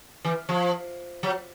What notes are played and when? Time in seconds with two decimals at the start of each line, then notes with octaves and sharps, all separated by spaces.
0.25 E3
0.49 F3
1.23 F#3